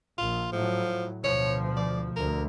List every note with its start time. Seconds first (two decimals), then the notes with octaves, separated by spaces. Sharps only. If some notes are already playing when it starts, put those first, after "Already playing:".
0.18 A#1 F4
0.52 A2 F3 F#3
1.24 D2 B2 F3 C#5
1.77 D5
2.16 D2 A#4